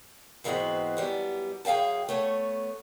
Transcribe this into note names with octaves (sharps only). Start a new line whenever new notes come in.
G#2 E3 G#3 B3 C4 F#4
F#2 G3 B3
F#2 G#4 F5 G5 A5
A3 B3 C#5